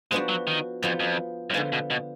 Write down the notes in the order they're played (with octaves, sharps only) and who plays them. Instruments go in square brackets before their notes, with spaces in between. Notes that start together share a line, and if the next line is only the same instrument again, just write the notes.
[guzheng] F3 B3 D4 F#4 [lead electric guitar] G#3
[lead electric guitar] F#3
D#3
[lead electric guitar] F2 [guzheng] F3 B3 F4
[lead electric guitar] F2
F#2
[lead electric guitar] G#2 [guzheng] D3 F3 B3 F4
[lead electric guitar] B2
B2